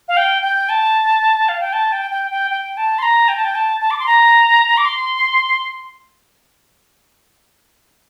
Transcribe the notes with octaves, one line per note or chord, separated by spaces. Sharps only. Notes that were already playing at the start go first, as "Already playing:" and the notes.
F5
G5
G5
A5
F5
G5
A5
G5
G5
G5
G5
A5
C6
A#5
G5
A5
G5
A5
A5
D6
C6
A#5
D6
C6